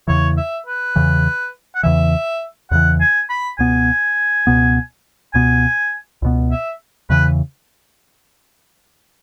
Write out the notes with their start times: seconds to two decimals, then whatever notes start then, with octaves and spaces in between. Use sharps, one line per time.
0.08 E2 C#3 E3 C#5
0.37 E5
0.66 B4
0.96 E2 C#3 E3
1.75 F#5
1.83 E2 C#3 E3 E5
2.71 E2 C#3 E3 F#5
3.01 G#5
3.30 B5
3.59 C#2 B2 B3 G#5
4.47 C#2 B2 B3
5.34 C#2 B2 B3 G#5
6.22 C#2 B2 B3
6.51 E5
7.10 E2 C#3 E3 B4